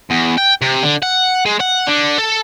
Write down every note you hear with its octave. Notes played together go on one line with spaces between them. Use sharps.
E2
G5
C3
D3
F#5
G#3
F#5
D3
A4